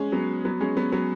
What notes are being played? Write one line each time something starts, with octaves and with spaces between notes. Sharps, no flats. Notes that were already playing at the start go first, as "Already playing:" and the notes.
Already playing: G#3 C#4
F#3 B3
F#3 B3
G#3 C#4
F#3 B3
F#3 B3